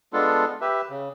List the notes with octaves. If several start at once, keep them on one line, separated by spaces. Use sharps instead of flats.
G#3 B3 D4 F4 A4
G4 B4 E5
C#3